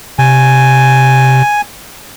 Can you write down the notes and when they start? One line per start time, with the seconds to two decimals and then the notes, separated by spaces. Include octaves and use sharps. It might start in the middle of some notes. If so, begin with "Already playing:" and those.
0.19 C3 G#5